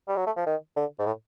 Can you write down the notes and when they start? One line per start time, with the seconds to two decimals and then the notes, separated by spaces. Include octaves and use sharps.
0.08 G3
0.17 F#3
0.26 A3
0.37 F3
0.47 D#3
0.76 D3
0.99 G#2
1.07 A2